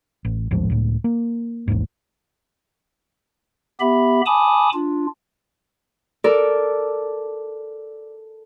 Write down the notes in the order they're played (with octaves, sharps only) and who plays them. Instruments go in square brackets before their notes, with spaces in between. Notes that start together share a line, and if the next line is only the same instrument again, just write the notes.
[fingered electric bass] A1
A1 D#2 G#2 F3
C#2 A2
A#3
A1 D#2 G#2
[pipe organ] B3 G4 E5 B5
G#5 A5 B5 D6 D#6
D4 F4
[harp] A4 A#4 D5